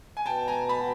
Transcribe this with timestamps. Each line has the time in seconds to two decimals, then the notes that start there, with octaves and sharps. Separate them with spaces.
0.17 G#5
0.26 B2 G5 A5
0.48 G#5 A#5
0.69 A5 B5